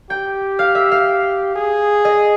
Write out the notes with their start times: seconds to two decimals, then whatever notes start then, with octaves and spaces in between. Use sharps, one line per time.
0.10 G4 G5
0.59 F5
0.75 E5
0.92 F5
1.56 G#4
2.05 D#5